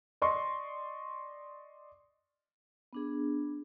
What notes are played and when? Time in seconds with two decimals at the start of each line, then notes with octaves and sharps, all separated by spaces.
0.22 D5 D#5 C6 C#6
2.93 B3 D4 G#4